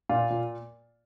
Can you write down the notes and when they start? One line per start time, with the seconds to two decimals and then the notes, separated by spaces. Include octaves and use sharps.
0.09 A#2 F4
0.30 A#2